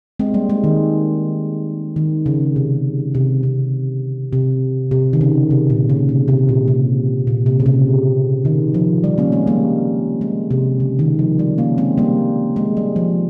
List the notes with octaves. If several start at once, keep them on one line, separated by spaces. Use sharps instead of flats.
G#3 C4
G3 A#3
G#3
D#3
D#3
C#3
C3
C3
C3
C3
C3
D#3
C#3
C3
A#2
C#3
C3
C3
A#2
C3
A#2
C3
C#3
C3
D#3
F3
G3
A#3 C#4
G#3 C4
G3 A#3
G#3
C3
C#3
D#3
F3
G3
A#3 C#4
G#3 C4
G3 A#3
G#3
G3
F3